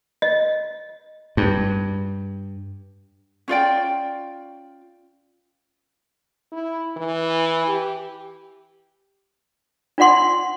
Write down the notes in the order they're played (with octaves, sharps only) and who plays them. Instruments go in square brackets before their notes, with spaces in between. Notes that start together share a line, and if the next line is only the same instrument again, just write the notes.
[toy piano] D#5
[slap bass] G2
[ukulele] C#4 F4 D5 G5
[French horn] E4
E3
G4
[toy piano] D4 F4 D5 F#5 C6